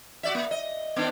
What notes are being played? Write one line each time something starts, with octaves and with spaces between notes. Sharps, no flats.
F#4 D5 E5
A#3
D#5
D#3 B3 D4